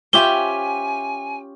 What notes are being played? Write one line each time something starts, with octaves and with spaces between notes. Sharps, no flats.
C#4 F4 G4 C5 E5 G5 G#5 G7